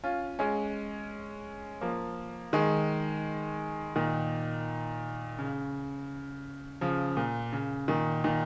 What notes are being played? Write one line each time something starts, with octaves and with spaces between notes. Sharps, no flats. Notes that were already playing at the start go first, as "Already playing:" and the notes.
C#4 F4
G#3 C#4
F3 A#3
D#3 G#3
A#2 D#3
C#3
C#3 F3
A#2
C#3
A#2 D#3
A#2 D#3